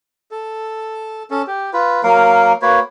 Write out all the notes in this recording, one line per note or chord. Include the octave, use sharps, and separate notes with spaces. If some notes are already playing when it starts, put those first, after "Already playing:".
A4
C#4 A4
G4
F4 B4
F#3 A#3 A#4 F5
A#3 F#4 B4 C#5